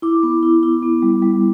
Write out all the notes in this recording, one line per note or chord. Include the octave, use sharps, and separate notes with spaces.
E4 D6
B3
E4
E4
B3
G3
G3